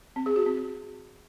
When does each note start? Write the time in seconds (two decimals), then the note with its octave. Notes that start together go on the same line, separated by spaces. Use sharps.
0.16 C4
0.26 G#4
0.36 F#4
0.46 C4